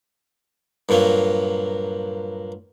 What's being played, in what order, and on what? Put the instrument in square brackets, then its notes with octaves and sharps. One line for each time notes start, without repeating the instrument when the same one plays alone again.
[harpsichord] G2 A#2 F#3 A#3